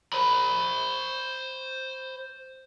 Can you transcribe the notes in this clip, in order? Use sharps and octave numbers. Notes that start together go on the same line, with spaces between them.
C5 B5